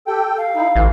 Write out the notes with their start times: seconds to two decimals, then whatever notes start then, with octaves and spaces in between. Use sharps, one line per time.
0.07 G4 A4 G5
0.38 F5
0.55 D#4 E4
0.76 A1 D3 E3